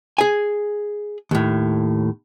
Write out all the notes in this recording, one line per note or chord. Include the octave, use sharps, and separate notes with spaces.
G#4 G#5
D#2 A2